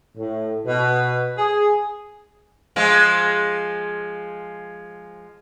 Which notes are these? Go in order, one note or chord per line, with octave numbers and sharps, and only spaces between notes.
A2
B2
G#4
F3 G#3 F4